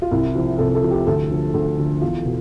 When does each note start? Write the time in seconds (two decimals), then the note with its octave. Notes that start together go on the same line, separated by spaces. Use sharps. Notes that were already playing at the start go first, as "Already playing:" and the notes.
0.02 F4
0.11 C2 E4
0.35 C3 F3
0.58 C2 A4
0.75 A4
0.83 C3 F3
0.91 G4
1.07 D2 A4
1.30 D3 F3
1.54 D2
1.77 D3 F3
2.02 E2 F4
2.25 B2